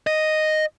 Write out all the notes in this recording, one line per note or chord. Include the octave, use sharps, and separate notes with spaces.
D#5